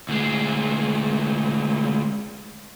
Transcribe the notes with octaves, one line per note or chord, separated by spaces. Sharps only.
D2 G#3